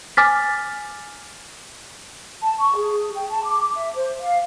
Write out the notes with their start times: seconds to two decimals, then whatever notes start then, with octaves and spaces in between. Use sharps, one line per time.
0.17 G#5 D6 F6 A6 B6
2.41 A5
2.58 C#6
2.75 G#4
3.15 G5
3.29 A5
3.43 D6
3.75 E5
3.95 C5
4.20 F5